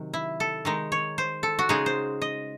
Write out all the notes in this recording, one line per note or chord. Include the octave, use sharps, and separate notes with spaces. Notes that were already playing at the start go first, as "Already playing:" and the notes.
Already playing: C3 D#3 F#3
E4
A4
D#3 G#3 D#4
C#5
C5
A4
F#4
C#3 G#3 D#4 G#4
C5
D#5